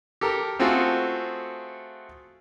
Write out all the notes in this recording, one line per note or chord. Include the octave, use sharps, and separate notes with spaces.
G4 A4 A#4
A3 C4 F4 F#4 G#4 A4